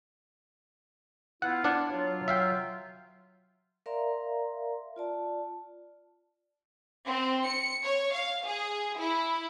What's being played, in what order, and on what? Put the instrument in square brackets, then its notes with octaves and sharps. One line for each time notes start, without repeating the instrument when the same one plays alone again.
[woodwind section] B3 E4 F4 [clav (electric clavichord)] F#5
[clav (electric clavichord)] D4 D5 F#5
[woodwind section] F#3 F4
[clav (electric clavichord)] E5 F5 G5
[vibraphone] A#4 D5 E5 F5 A#5 C6
F4 D5 A5
[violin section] C4
C#7
C#5
F5
G#4
E4